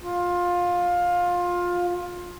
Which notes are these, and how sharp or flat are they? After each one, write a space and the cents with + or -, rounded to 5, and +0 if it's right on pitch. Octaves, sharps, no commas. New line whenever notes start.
F4 +20